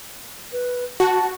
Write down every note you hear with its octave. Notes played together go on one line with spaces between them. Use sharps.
B4
F#4 A5